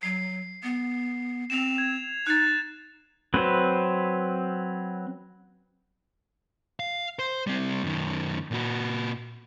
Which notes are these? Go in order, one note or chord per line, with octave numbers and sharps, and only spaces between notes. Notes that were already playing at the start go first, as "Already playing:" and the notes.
F#3 C7
B3
C4 E7 F7
G#6
D#4 F#6 A6
F#3 C4 B4
F5
C5
G3 C4
F#2 D#3
A#2 F#4